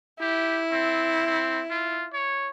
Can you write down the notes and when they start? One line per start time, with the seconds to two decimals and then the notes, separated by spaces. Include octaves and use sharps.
0.21 E4 G4
0.72 C4
1.27 C4
1.70 F4
2.13 C#5